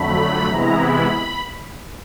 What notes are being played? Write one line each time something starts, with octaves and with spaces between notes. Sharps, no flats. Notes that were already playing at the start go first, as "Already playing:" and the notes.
Already playing: F2 D3 F#3 A3 B5
C3 E3 G#3 B3 E4 A#5
B5